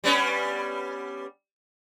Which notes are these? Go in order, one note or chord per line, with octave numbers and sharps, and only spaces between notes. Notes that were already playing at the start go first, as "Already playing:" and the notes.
G3 B3 C#4